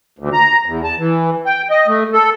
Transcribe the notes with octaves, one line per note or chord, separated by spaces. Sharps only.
D2
A#5
E2
A5
E3
G5
D#5
A3
A4